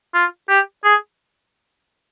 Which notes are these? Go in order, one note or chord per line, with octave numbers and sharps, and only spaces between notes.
F4
G4
G#4